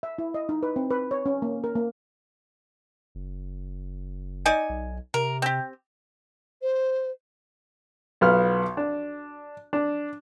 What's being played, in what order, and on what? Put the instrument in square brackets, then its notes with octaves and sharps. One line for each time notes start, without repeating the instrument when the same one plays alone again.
[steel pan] E5
E4
D#5
D#4
B4
C4
B4
C#5
C#4
A#3
A#4
A#3
[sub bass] F#1
[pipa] D#4 D5 G#5
[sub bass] B1
[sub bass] C3 [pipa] A#4
[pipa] C4 G4
[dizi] C5
[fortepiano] B1 B3 F4 F6
D4
D4